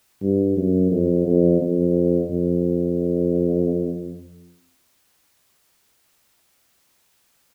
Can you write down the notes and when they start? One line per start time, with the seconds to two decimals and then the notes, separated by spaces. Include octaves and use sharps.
0.22 G2
0.57 F#2
0.92 F2
1.26 F2
1.61 F2
2.30 F2